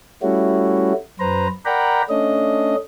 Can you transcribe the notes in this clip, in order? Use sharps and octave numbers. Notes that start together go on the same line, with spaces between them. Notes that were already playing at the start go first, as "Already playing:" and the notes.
G3 A3 C#4 E4 F#4
F#2 B4 C5 A#5
A#4 D5 F#5 G5 A#5 B5
A3 C#4 D4 D#5